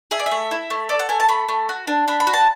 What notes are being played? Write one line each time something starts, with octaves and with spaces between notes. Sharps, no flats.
G#4 E5
D5
E5
A3
E4
A3
A4 D5
F#5
A3 G#5
A5
A3 B5
A3
F#4
D4
D4 B5
B5
F#4
A5